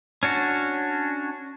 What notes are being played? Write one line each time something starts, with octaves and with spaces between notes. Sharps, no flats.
C#4 D4 F#4